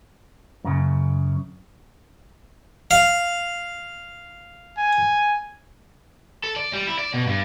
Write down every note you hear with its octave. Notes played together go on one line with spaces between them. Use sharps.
F#2 C#3
F5
G#5
A4
D5
G3
E4
D5
B2
G2